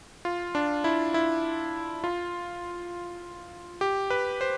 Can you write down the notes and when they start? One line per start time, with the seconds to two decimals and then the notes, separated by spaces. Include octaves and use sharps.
0.25 F4
0.55 D4
0.84 E4
1.14 E4
2.04 F4
3.81 G4
4.10 B4
4.41 C5